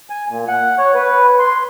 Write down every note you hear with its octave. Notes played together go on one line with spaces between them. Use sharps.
G#5
A#2
F#5
C#5
B4
C6